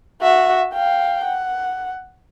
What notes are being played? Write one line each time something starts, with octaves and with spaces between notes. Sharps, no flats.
F#4 E5
F5 G5
F#5